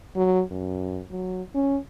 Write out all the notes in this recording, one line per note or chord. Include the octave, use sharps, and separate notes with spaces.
F#3
F#2
F#3
C#4